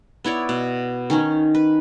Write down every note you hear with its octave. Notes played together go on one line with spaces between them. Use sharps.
B3 E4 C#5 D5
B2
D#3 C#4 D#4
B4